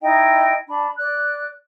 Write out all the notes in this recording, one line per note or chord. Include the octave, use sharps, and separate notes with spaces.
D#4 E4 D#5 G5
D4 B5
D5 F#6